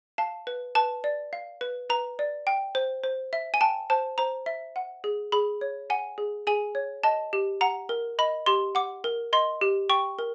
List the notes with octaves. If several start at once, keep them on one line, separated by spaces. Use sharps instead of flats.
F5 A5
B4
B4 A5
D5
F5
B4
B4 A#5
D5
G5
C5
C5
E5
G#5
G5 A5
C5 A5
C5 A#5
E5
F#5
G#4
G#4 B5
C#5
F#5 G#5
G#4
G#4 G#5
C#5
D#5 A5
G4
F#5 A#5
A#4
D#5 B5
G4 C6
F#5 D6
A#4
D#5 C6
G4
G5 C#6
A#4